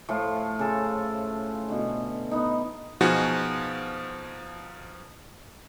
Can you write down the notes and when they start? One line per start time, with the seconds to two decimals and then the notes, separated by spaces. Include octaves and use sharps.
0.09 A2 F3 A3 F4
0.59 C#3 A4
1.68 B2 D3
2.31 B3 D#4
3.01 B2 F3 D#4 F#4 G#4